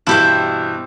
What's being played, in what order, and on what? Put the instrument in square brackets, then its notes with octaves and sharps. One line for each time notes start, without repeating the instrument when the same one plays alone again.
[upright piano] G2 B2 E3 [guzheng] E4 G4 C5